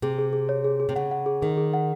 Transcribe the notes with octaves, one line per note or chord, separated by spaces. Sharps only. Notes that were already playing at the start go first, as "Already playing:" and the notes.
C3 G#4
G#4
G#4
C#5
G#4
G#4
C3
C#3 F#5
F#5
G#4
D#3 G#4
G#4
F#5